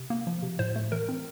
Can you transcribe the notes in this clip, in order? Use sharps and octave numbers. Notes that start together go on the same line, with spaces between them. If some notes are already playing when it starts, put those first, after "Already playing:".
Already playing: C3
A#3
F3
C3
A2 C5
A3
E3 A#4
C4